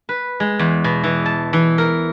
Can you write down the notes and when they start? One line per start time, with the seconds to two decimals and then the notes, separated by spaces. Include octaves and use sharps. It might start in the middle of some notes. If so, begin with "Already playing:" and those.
0.09 B4
0.40 G#3
0.59 E2
0.84 B2
1.04 E3
1.26 A5
1.53 E3
1.78 A#4